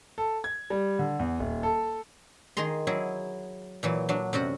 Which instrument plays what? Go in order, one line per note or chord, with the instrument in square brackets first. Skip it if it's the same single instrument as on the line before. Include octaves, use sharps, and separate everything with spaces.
[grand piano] A4
G#6
G3
D3
E2
D#1
A4
[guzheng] D#3 G#4 A#5 C6
F#3 E4 G#4
A#2 E3 F#3
F#3 D4
F#2 C3 F#4 F#5